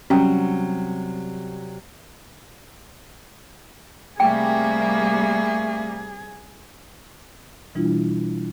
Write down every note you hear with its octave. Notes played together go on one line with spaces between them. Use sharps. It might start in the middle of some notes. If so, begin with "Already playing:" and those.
C3 F#3 G3 C#4 G5
C3 G3 A3 A#3 G#4 G5
B2 E3 G3 D4 E4 F4